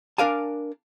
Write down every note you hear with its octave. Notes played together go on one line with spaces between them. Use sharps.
D4 A#4 D5 F5 G#5 A5